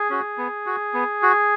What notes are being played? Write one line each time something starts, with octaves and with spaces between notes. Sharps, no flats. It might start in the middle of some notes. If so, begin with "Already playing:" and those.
Already playing: G#4
C#4 F#4
B3
F#4
B3
F#4